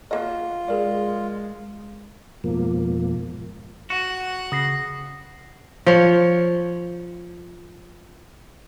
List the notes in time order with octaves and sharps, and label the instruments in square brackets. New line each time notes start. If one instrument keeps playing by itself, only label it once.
[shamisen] F#3 A#3 D#5 [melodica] F4
[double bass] G#3 [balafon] G#4 A#4 D5
[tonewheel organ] F2 G#2 B2 F3 A#3
[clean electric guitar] F#4 [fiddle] F#5
[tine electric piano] C#3 [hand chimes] D#6 A#6 C7
[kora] F3 C#5